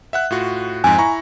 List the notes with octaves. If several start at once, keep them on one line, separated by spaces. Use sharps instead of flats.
E5 F#5 F#6
A2 F4 F#4
F2 G#2 G#5
E4 A#5 C#6